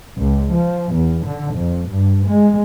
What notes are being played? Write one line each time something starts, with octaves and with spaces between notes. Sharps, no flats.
C#2
F3
E2
D3
F2
G2
G#3